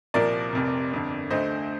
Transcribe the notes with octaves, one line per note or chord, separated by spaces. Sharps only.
C2 A#2 F3 A#3 A#4 D5
F1 F2 C3
G1 F2 D3
D2 D3 A3 C5 D#5